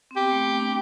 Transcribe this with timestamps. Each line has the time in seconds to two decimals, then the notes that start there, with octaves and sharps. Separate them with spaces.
0.11 C4
0.16 B3 G4
0.31 A3
0.46 B3
0.60 D4